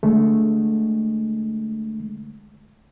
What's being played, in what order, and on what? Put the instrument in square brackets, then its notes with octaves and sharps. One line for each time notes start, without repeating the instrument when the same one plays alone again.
[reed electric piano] D3 G#3 A3